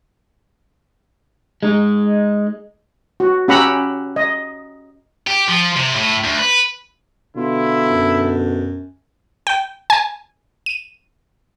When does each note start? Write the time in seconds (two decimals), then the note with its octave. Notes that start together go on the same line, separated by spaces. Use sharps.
1.63 G#3 D#4
3.20 F#4
3.48 C#4 G4 F#5 A#5 B5 E6
4.16 D#5
5.27 G4
5.49 F3
5.76 C3
5.95 A2
6.24 D2
6.39 B4
7.36 B2 D3 E4 F4
7.90 F#2
9.47 G5
9.90 G#5
10.66 D#7